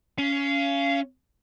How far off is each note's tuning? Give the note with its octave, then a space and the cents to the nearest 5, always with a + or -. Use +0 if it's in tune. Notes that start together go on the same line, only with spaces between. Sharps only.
C#4 +15 F5 -20